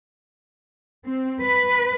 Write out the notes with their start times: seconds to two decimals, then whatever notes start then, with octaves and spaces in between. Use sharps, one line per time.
1.06 C4
1.43 B4